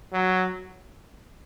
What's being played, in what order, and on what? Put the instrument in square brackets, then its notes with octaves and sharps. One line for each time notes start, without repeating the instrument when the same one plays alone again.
[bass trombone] F#3